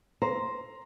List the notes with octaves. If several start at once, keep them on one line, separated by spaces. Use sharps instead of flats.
C5 A#5